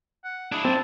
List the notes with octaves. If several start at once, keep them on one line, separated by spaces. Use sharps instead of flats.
F#5
D4 E4 G#4
C4 A5